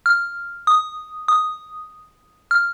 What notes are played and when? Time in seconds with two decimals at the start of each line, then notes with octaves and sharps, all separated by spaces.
0.06 F6
0.67 D#6
1.28 D#6
2.51 F6